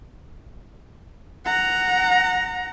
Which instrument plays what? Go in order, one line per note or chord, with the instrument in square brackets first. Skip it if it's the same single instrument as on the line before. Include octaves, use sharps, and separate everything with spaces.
[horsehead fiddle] F#5 A#5